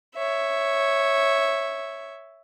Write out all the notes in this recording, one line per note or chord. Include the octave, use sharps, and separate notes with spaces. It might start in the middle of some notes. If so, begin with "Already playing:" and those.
C#5 E5